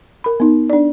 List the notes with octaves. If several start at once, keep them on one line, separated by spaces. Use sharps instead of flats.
A#4 B5
B3 D#4
D4 D5